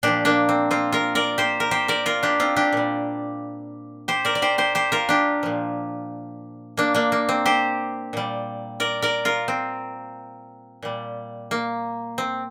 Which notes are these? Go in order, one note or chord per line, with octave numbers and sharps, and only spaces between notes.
A#2 F3 D4 G4
A#3 D4
C4
C4 F4
F4 A#4
A#4 D5
G4 C5
A#4
G4 C5
A#4 D5
F4 A#4
D4 G4
C4 F4
D4 G4
A#2 G3
G4 C5
A#4 D5
D5
G4 C5
G4 C5
G4 C5
F4 A#4
D4 G4
A#2 F3
A#3 D4
A#3 D4
A#3
C4
G4 C5
A#2 G3
A#4 D5
A#4 D5
F4 A#4
C4
A#2 G3
A#3
C4